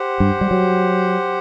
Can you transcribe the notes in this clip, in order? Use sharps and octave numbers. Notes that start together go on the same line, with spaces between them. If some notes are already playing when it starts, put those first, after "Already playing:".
Already playing: G4 C5 F#5
G2
G3
F#3